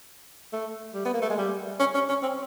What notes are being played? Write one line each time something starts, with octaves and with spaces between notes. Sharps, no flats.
A3
G3
B3
A#3
A3
G#3
G3
C#4
C#4
C#4
C4